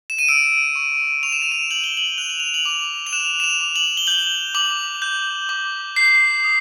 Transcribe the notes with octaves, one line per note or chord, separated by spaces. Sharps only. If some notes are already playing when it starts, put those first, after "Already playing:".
E7
D#7
E6 D7
C#6
C#6 F7
E7
D#7
E7
G6 F#7
G7
F#7
F#6 F7
F#7
F7
F#7
D6 F7
F7
F#6 E7
E7
F7
D6
F#7
G7
G6 F#7
D6 F#7
G6
D6
G6 C7
D#6